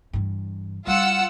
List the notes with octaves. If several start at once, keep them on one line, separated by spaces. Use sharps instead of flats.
G2 E3
G3 E4 F4 F#5 E6